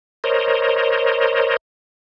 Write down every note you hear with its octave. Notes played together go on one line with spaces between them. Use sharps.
A#4 C5 C#5 D#5